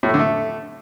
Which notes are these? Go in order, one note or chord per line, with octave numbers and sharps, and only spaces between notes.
A2
A3
D3
A3